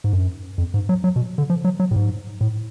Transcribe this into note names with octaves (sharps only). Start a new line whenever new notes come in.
G#2
F#2
F2
G#2
F#3
F#3
B2
D3
F3
F#3
F#3
A2
G#2
A2